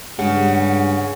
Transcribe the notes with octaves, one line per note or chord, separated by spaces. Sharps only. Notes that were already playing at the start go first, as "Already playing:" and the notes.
G2 C#3 G#3 G4 F#5